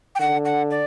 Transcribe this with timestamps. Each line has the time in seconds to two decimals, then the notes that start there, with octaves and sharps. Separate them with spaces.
0.15 G5
0.20 D3 F#5
0.45 F#5
0.70 D5